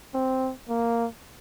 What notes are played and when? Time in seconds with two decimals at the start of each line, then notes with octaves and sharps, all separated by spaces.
0.14 C4
0.69 A#3